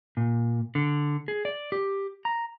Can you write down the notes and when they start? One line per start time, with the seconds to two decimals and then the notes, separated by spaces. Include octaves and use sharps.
0.17 A#2
0.75 D3
1.28 G#4
1.45 D5
1.72 G4
2.25 A#5